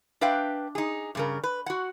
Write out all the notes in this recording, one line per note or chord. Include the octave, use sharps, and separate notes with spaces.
D4 B4 E5 F5 G5
D#4 G#4
G2 C#3 A#4
B4
F#4 F#5